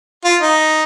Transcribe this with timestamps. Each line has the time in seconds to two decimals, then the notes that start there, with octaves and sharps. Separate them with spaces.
0.24 F4
0.41 D#4